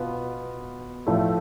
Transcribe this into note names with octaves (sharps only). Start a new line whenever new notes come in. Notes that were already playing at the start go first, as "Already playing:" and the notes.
Already playing: B2 B3 F4
A2 F3 A3